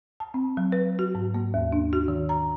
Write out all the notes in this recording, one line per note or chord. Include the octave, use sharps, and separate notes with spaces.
A5
C4
F#3
B4
F#4
G#2
A#3
D#2
D4
F#4
D#3
A#5